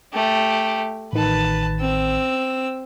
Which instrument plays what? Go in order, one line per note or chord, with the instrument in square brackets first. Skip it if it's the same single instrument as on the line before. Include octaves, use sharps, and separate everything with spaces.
[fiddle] A3 G4
[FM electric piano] A1 D#3 [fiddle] B4 A5
[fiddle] C4 E6